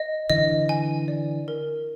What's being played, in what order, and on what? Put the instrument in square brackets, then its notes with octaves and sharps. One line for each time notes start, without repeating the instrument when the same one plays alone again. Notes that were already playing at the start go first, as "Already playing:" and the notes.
Already playing: [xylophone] D#5
[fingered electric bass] D3 E3 [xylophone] D#5
[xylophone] G#5
D5
A#4